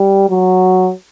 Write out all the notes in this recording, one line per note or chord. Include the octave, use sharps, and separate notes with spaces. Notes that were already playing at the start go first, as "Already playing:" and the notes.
Already playing: G3
F#3